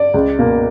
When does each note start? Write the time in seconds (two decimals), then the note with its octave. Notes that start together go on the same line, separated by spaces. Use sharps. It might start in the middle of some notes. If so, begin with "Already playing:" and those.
Already playing: D5
0.14 C#2
0.39 B2 A#3